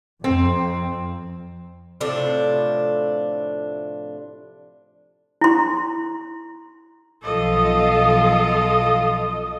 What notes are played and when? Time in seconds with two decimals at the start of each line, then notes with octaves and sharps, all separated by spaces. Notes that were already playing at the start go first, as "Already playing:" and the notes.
0.24 F2 C4
2.00 A2 C3 F3 D4
5.41 E4 C6
7.23 B1 F3 F4 A4 D#5